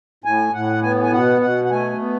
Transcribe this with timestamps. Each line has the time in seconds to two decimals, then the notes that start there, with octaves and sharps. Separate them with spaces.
0.24 A2 G#5
0.53 A2 F#5
0.82 B3 G#5
1.03 G#5
1.12 B2 F#5
1.41 B2 F#5
1.65 F#5
1.71 A3 G#5
1.99 B3